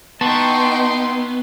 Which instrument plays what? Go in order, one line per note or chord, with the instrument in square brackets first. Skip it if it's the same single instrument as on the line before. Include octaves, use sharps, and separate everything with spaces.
[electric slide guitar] B3 [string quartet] D#4 D#5 G5 [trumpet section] E4 C6 [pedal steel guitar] A5 C#6